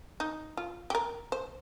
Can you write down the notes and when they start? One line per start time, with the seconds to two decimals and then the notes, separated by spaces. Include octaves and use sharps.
0.20 D#4
0.57 F4
0.90 G4
0.95 A#4
1.32 C5